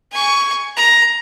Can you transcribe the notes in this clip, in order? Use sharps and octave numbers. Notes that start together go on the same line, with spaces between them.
G#5 C#6
A#5